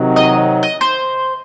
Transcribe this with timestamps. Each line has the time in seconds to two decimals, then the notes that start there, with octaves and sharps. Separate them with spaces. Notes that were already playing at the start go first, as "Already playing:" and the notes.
Already playing: C3 D#3 F#3
0.16 D#5
0.63 D#5
0.81 C5